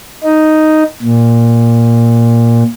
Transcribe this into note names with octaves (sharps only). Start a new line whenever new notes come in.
D#4
A#2